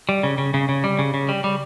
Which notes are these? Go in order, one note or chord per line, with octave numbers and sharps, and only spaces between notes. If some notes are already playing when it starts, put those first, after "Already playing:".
G3
C#3
C#3
C#3
C#3
G3
C#3
C#3
G3
G3